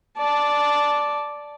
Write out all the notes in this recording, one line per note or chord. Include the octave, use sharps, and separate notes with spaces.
D5 A5